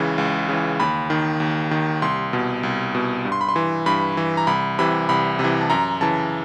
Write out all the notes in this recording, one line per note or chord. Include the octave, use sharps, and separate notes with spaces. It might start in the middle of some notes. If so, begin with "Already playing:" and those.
Already playing: C#2 C#3 E3
C#2
C#3 E3
D#2 B5
D#3
D#2
D#3
C2 C6
B2
C2
B2
G2
C6
B5
C6
E3
G2 B5
E3
A#5
C2 B5
C3 E3 B5
C2 B5
C3
E3
A5
F#2 A#5
C#3 E3 A5